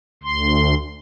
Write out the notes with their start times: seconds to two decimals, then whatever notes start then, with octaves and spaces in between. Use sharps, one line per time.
0.23 D2 C6